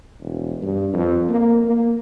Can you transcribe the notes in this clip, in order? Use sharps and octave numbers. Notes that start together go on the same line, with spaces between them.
E1
G2
F2
A#3
A#3